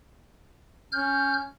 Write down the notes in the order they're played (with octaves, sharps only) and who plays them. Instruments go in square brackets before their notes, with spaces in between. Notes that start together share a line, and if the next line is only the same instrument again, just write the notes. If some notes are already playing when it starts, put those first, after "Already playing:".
[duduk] C#4 [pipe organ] F6 G6